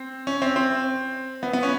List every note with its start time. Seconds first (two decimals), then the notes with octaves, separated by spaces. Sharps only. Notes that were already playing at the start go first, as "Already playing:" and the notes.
Already playing: C4
0.27 C#4
0.42 C4
0.56 C4
1.43 B3
1.53 B3
1.63 C#4